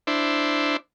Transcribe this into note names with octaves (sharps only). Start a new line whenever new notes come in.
D4 E4 C5